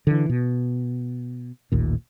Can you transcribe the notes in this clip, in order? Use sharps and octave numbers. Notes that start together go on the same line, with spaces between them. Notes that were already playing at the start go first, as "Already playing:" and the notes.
D3 E3
B2
A1 D#2 A#2